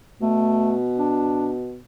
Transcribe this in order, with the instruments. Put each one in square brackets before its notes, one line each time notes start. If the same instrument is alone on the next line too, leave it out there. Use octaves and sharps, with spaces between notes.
[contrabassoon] B2 [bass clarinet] A3
[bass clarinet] D4